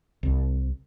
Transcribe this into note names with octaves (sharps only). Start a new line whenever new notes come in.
C2